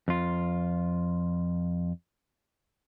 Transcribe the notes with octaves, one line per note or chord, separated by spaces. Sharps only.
F2 F4